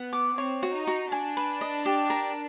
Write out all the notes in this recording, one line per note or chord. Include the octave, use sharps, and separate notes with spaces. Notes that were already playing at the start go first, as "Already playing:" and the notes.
Already playing: B3 F#5
D6
C4 C#5
F#4
D#4
F#4
D4 G#5
B4
D#5
G4
A#4